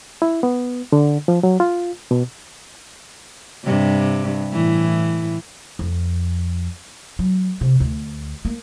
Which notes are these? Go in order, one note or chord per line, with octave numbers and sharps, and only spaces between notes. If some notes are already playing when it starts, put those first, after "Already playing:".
E4
B3
D3
F3
F#3
F4
B2
G2 C3
A2 E3
F2
F#3
C3
D2
A#3